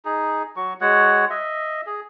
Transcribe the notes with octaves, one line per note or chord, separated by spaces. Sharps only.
D#4 G#4
F#3 F#4 C#6
G#3 F#4 C#5 F#5
D#5 E5
G#4